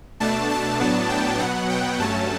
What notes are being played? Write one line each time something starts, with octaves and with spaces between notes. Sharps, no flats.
B2 A3 D4 A5
A5
A2 F#3 B3 D4
G5
B2 F#3 B3 F#5
G5
G2 F#3 A3 C#4 A5